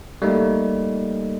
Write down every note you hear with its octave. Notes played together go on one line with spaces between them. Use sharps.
G3 A3 A#3 D#4